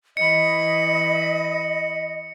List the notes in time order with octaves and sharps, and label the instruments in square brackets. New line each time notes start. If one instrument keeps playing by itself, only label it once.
[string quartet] E3 B5 [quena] D#5 [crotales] C#7